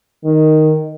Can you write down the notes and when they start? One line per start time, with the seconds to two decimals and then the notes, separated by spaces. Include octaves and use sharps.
0.24 D#3